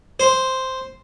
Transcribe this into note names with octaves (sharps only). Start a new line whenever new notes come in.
C5